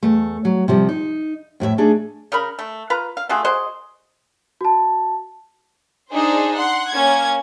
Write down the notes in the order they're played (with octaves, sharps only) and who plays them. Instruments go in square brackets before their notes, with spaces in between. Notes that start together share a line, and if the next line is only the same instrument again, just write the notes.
[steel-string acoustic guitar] E2 A3
F#3
C3 F3 G3
D#4
F2 A2 G#4 E5
A3 D4 D#4 G#4
[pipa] C#3 A#4 B5
A3
F4 B4 A#5
F5
A3 F4 F#4 G#4
F#4 G#4 C5 D#5
[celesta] F#4 A5
[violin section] D4 D#4 G#4 C5
F#5 C6
A#3 C#4 G#6